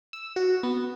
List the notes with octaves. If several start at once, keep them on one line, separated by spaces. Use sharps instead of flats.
E6
F#4
B3